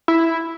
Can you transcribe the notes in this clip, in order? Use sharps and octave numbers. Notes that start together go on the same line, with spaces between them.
E4